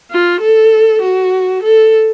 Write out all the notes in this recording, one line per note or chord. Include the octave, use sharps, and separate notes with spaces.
F4
A4
F#4
A4